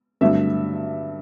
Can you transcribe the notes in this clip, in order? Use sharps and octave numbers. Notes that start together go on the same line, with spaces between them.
G2 D3 F#3 A3 E5